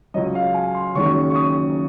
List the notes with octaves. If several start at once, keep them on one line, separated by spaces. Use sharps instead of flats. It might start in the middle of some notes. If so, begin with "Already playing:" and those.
C#2 C#3 F#3 D#5
F5
G#5
C6
F#1 F#2 D#3 G#3 C#6
C#6
D#6